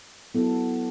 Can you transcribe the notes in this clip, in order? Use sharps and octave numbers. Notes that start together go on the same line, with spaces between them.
F#3 B3 E4 A4